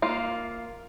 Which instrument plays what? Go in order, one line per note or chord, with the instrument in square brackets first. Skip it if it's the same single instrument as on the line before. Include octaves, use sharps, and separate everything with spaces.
[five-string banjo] A#3 F4